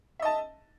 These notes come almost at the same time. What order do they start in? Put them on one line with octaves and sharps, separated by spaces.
E5 D#5 A5